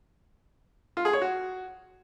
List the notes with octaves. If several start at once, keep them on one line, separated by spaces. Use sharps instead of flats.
F4
G#4
C#5
F#4